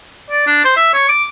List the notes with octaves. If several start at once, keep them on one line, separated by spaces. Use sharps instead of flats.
D5
D4
C5
E5
C#5
D6